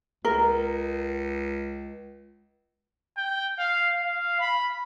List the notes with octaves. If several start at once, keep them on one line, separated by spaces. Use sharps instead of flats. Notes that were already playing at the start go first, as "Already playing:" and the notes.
C#2 A#4
G5
F5
F5
B5